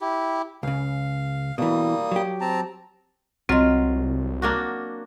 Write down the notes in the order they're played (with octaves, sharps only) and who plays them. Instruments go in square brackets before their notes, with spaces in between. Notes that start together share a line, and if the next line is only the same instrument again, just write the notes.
[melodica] E4 G4
[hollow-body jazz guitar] C#2 C#3 [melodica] F5
[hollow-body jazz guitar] B2 E3 [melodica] G3 A#3 D#6
[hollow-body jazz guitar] F#3 G4
[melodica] C4 A5 A#5
[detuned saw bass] C2 [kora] F#3 F4 [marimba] C4 D#5
[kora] A#3 D4 F#4